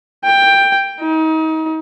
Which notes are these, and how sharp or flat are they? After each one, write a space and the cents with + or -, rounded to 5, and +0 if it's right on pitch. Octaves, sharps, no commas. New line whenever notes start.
G5 +10
D#4 +35